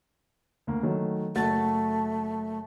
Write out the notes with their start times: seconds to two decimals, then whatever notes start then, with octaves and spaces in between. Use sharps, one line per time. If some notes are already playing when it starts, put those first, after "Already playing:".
0.67 D2 A#3
0.83 D#3 F#3 A3
1.35 F#1 A3 F#4 A6